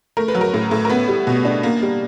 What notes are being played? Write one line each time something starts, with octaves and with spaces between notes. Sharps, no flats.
A3 A#4
B4
F#3
A#4
A2
A2
A#4
B3 B4
G3
B2
D4
A#3
G3